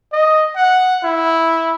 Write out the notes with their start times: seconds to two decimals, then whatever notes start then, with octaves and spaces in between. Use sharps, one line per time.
0.13 D#5
0.56 F#5
1.04 E4